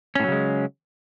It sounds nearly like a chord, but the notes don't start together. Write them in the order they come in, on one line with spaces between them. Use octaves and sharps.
C#4 A2 F#3 C#3 G#3